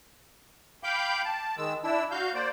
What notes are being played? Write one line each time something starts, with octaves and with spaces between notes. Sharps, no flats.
F5 G5 B5 D6 G6
A5
D#3 G#3 E6
D4 E4 E6
F#4 F5 G6
A#3 C5 D5